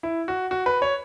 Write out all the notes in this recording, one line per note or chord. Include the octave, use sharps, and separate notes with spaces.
E4
F#4
F#4
B4
C#5